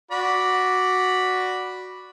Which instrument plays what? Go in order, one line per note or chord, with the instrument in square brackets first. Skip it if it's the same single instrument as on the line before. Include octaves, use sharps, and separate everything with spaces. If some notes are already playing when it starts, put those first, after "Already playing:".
[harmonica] F#4 D5 B5